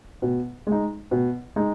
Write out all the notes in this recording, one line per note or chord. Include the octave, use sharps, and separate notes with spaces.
B2
G#3
D#4
B2
G#3 D#4